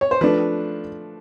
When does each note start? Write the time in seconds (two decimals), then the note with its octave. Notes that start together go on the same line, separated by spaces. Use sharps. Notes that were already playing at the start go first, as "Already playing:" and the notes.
0.01 C#5
0.11 C5
0.21 F3 A3 D4 B4